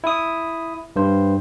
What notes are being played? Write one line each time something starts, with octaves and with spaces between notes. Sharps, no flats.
E4 D#6
G2 C5